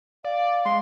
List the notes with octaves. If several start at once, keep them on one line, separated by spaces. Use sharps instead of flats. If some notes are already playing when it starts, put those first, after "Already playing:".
D5 F5
G#3 C6